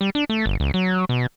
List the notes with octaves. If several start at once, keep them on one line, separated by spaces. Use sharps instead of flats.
G3
D4
A3
G1
C#2
F#3
B2